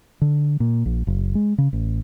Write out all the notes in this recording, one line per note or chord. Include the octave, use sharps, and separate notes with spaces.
D3
A#2
A#1
F#1
G#3
C#3
A1